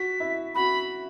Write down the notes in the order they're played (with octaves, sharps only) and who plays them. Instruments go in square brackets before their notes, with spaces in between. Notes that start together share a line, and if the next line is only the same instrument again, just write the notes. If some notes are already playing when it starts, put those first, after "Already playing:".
Already playing: [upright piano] F#4 [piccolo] B6
[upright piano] E4
[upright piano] F#4 [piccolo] B5